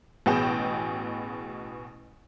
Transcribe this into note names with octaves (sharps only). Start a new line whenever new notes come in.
A1 B2 B3 G#4 G5 E7